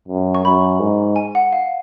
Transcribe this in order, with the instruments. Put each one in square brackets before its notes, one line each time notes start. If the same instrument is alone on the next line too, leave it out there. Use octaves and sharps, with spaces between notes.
[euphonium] F#2
[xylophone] C#6
[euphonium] F#2 [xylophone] B5
[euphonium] G#2
[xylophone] G#5
F#5
F5